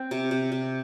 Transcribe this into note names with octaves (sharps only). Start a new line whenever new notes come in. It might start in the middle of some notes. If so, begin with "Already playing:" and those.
Already playing: C4
C3
C3
C3